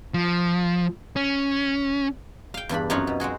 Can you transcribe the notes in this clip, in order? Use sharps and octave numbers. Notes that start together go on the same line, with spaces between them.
F3
C#4
F5 G5
E2 G2 D4 B5
F#2 C4 D#4 F4 C#5 F#5
B2
G#3 C4 F#4 G#4